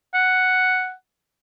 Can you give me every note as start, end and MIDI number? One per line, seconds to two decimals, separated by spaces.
0.15 0.93 78